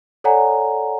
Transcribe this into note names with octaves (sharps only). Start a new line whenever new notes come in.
A4 C#5 D5 F#5 G#5 A#5